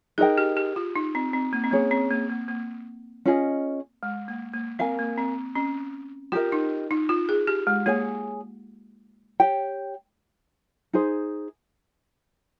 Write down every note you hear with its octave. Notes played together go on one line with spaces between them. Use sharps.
D#4 G#4 A#4 D#5 G5
G4
G4
F4
D#4
C4
C4
A#3
C4
A#3 C#4 G#4 C#5
C4
A#3
A#3
A#3
C#4 F4 G#4 D#5
G#3
A#3
A#3
C4 A#4 F5 G#5
A#3
C4
C#4
F4 G4 A#4 D#5
D#4
D#4
F4
G#4
G4
G#3
A#3 G#4 C#5 G#5
G4 C#5 G5
D#4 G#4 C5